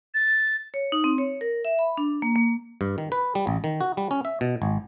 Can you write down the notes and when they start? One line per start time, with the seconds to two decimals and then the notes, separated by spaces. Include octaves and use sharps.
0.14 A6
0.74 C#5
0.92 D#4
1.04 C4
1.18 C#5
1.41 A#4
1.65 E5
1.79 B5
1.98 D4
2.22 A#3
2.36 A#3
2.81 G2
2.98 D#3
3.12 B4
3.35 G3
3.47 A1
3.64 D#3
3.81 F#4
3.97 G3
4.11 C#4
4.25 E5
4.41 B2
4.62 G#1